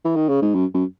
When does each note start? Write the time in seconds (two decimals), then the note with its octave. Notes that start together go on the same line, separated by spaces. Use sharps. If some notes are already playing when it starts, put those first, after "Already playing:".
0.05 E3
0.16 D#3
0.29 C#3
0.42 G#2
0.55 F#2
0.74 F#2